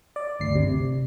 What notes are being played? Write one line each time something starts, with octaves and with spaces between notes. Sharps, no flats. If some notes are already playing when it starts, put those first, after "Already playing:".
D5
G1 D2 C7
C3